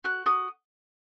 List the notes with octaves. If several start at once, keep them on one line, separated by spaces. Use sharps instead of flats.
F#4 F#6
F#4 D#6